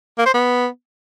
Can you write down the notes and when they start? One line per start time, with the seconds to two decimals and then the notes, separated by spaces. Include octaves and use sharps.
0.19 A#3
0.26 C5
0.34 B3